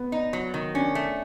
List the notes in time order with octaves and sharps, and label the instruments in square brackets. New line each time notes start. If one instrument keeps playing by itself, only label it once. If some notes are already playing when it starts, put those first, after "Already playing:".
Already playing: [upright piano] B3
[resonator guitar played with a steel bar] D#4
F#3
D#3
[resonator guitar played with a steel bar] C#4 [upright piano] D4
[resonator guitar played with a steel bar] A3